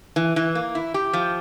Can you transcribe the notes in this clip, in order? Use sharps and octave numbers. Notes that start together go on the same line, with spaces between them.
E3
E3
A#3
E4
G4
F3